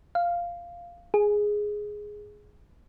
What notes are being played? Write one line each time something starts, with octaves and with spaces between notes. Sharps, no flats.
F5
G#4